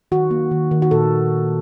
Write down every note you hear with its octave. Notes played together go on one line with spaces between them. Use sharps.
D#3 F#4
A#3
D#3
D#3
F#4
A#2 A4